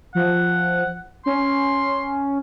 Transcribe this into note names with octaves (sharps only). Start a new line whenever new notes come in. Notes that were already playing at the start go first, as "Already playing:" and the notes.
F3 F#5
C#4 C6